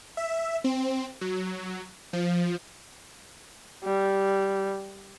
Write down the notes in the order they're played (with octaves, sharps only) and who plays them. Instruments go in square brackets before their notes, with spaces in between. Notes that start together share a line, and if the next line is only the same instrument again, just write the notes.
[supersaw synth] E5
C4
F#3
F3
[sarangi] G3